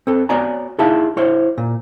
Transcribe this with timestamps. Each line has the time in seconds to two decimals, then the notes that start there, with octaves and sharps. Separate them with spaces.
0.07 C4 A4
0.29 B3 F#4 C#5 D5 G#5 A#5
0.79 D#4 E4 G#4 E5 F5 A5
1.17 E4 C5 C#5
1.58 A#2